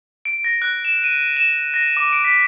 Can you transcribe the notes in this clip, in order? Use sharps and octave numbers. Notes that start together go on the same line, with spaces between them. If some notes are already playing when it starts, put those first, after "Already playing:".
D7
A#6
F#6
E7
D#7
E7
A#6
D6
D7
B6